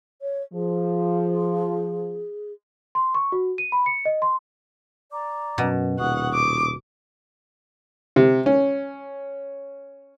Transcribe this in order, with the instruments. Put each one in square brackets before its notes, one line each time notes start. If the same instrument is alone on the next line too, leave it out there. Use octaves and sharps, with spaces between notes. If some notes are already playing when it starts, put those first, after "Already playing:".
[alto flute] C#5
[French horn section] F3 [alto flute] G#4
[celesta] C6
C#6
F#4
D#7
B5
C#7
D#5
C6
[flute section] D5 A#5 D6
[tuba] F#2 [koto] B2
[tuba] D#1 [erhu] F#5 [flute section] C#6 D#6
[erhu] D6
[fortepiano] C3
C#4